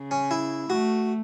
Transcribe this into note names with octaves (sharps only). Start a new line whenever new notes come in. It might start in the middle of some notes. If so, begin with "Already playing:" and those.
Already playing: C#3
C#4
E4
A3 F#4